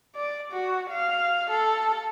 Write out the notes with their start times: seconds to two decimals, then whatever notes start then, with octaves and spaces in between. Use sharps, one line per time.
0.16 D5
0.52 F#4
0.90 F5
1.50 A4